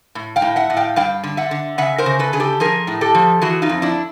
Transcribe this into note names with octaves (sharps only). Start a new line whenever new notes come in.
A2
F5 G5
A2
E5 F#5
A2
F5 G5
G2 F5 G5
D3
E5 F#5
D3
C#3 E5 F#5
A#4 C5
C#3
A4 B4
C#3 G#4
G4 A4
F3 G#4 A#4
A2
G4 A4
F3
E3 F#4 G#4
D#4 F4
F2
D4 E4